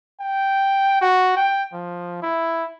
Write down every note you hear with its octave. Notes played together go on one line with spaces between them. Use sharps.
G5
F#4
G5
F3
E4